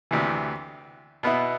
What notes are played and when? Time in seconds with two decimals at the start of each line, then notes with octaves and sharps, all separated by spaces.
0.11 D2 C3 E3
1.23 B2 B3 E4